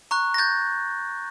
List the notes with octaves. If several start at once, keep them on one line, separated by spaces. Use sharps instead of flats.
A#5 C#6 F#6
A#6
G6 A6